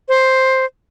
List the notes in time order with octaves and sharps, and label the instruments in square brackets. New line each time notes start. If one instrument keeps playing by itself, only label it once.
[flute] C5